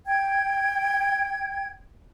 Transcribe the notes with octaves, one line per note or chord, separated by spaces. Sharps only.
G5 G#6